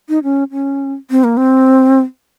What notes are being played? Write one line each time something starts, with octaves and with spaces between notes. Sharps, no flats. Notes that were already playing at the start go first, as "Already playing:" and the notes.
D#4
C#4
C#4
C4
A#3
C4